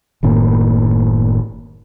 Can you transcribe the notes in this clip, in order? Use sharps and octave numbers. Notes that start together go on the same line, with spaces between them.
F#1 A2 D#3 A#3